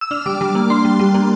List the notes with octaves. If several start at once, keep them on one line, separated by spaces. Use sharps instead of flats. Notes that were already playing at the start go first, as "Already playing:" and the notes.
E6
D4 F6
G3 D6
G3
A#3
D4 C6
G3
G3
A#3